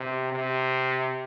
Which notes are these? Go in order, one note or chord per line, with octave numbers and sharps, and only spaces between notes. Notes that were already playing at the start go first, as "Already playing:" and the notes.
Already playing: C3
C3